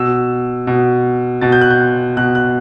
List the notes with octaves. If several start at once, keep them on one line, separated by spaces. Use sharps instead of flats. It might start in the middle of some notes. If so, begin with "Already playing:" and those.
Already playing: B2 E6
B2
B2 A6
G6
F#6
G6
B2 F#6
F#6